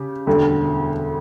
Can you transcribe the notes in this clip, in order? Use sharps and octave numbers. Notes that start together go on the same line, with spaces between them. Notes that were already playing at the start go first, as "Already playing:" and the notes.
Already playing: C#3 G4
E1 D2 D3 G3